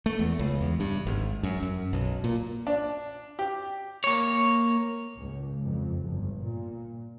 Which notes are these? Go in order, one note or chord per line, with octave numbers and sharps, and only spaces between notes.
A3
E2
C#2
E2
G2
G#1
F#2
F#2
B1
A#2
D4
G4
A#3 C#5
C#2
F2
G1
A#2